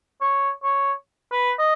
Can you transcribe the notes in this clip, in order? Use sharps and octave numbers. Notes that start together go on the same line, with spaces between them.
C#5
C#5
B4
D#5